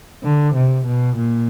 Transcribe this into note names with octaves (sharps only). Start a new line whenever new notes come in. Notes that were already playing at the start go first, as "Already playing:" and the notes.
D3
C3
B2
A#2